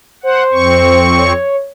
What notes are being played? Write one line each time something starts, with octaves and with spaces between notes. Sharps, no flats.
C5 F#5
F2 C4 C#6
C#5